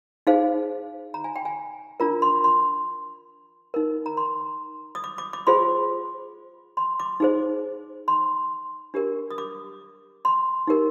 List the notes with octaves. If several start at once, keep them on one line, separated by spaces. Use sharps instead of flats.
D#4 G#4 C5 F5
A#5
G#5
G5
G#5
D4 F4 A#4 A#5
C6
C6
D#4 A#4
A#5
C6
D#6
D6
D6
D6
F4 G#4 C5 C6
C6
D6
D#4 G#4 C5
C6
D4 G4 A#4
D#6
D6
C6
D#4 G4 A#4